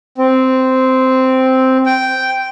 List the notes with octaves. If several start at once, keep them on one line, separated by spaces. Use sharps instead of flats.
C4
G5